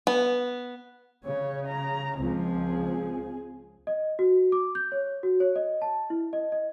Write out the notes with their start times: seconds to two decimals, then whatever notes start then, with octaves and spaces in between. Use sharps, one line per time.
0.07 B3
1.24 C#3 C#5
1.67 A#5
2.19 C#2 F3 C4 G#4
3.87 D#5
4.19 F#4
4.52 D6
4.75 G6
4.92 C#5
5.23 F#4
5.40 C#5
5.56 D#5
5.82 A5
6.10 E4
6.33 D#5
6.52 D#5